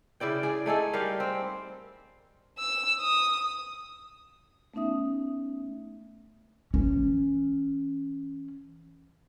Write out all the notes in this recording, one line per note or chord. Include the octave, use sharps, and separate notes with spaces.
C#3 E4 D5 G5
G#4 D5
A3 D#4 G#4 A4
G3 G4 A#4 F5
C4
E6
D#6
A3 B3 C#4 D#4 E5 D#6
E3 C#4